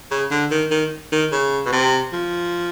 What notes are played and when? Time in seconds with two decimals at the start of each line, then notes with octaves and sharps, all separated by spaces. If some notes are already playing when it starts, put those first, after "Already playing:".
0.11 C#3
0.31 D3
0.51 D#3
0.71 D#3
1.12 D#3
1.32 C#3
1.66 B2
1.72 C3
2.13 F3